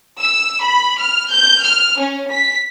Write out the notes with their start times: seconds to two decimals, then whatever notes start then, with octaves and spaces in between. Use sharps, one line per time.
0.20 E6
0.63 B5
1.01 F6
1.32 G6
1.63 F6
2.00 C#4
2.33 B6